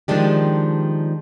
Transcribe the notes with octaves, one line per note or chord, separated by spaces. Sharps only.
D#3 F3 G#3 D4 G4